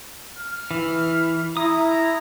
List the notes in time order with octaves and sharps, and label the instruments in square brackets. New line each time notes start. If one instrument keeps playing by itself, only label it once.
[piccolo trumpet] F6
[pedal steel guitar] E3
[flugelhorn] E4 [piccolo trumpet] A#5 [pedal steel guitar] D#6